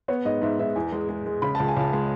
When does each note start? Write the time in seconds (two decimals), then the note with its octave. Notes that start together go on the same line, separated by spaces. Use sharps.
0.08 B3 C#5
0.25 G#2 D#5
0.42 G#2 E5
0.59 G#2 E5
0.76 E2 G#5
0.92 G#3
1.09 G#3
1.26 G#3
1.42 C#3 B5
1.55 C#2 A5
1.68 G#5
1.76 C#2 A5
1.93 G#3